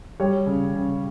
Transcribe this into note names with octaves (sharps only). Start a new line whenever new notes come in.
G3 C#5
C#3
C#3